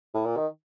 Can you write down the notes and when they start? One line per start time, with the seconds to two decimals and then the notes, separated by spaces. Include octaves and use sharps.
0.15 A2
0.25 A#2
0.36 D#3